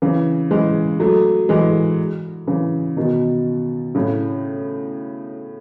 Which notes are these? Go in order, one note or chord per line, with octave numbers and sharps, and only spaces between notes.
C#3 E3
E3 G#3
F#3 A3
E3 G#3
C#3 E3
B2 D#3
A2 C#3